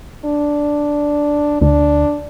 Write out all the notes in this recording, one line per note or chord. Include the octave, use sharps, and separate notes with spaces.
D4
D2 D4